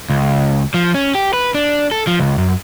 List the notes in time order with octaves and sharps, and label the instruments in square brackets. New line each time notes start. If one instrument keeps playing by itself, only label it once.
[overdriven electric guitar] C#2
F3
C#4
G4
B4
D4
A4
F3
C#2
F#2